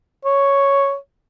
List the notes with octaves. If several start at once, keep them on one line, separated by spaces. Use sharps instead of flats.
C#5